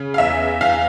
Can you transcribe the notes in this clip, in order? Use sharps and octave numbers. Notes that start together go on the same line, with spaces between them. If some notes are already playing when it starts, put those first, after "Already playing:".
Already playing: C#3
F5
E2 E5
E2 F5